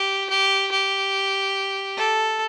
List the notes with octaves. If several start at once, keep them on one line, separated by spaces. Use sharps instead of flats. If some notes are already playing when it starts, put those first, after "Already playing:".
Already playing: G4
G4
G4
A4